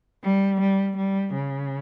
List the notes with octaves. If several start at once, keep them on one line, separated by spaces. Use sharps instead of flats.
G3
G3
G3
C#3